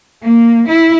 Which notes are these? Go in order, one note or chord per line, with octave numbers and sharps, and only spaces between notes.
A#3
E4